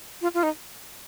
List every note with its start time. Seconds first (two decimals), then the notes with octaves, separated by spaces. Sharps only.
0.21 F4
0.34 F4
0.43 D#4